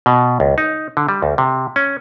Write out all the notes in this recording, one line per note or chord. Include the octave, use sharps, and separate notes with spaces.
B2
C#2
D#4
D3
G3
D2
C3
C#4